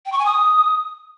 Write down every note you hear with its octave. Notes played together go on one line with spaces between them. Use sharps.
G5
C#6
G#5
D#6